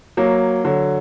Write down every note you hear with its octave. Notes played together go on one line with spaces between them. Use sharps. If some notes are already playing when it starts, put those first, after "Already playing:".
F#3 A#3
D3 F#3